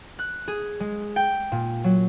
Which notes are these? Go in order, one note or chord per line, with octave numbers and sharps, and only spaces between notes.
F#6
G#4
G#3
G5
A#2
F#3